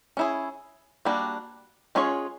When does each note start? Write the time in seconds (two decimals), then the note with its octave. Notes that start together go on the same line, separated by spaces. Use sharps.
0.17 C#4 E4 G#4
1.05 G3 A#3 D4 F#4
1.95 G#3 C#4 F4 G#4 C#5